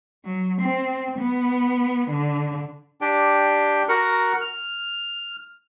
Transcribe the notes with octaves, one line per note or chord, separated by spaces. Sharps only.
F#3
C4
B3
D3
D4 G4 G5
F#4 A#4 F#5
F6